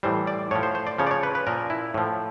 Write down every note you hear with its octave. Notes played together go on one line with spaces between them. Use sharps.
A2 E3 G3 C5
D5
A2 F3 C#5
C5
C5
D5
C#3 F3 C#5
D5
C#5
B4
B4
A#2 F3 A#4
E4
A2 F3